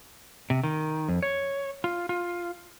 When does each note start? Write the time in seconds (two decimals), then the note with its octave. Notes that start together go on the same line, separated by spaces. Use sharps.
0.50 C3
0.64 D#3
1.09 F2
1.23 C#5
1.84 F4
2.09 F4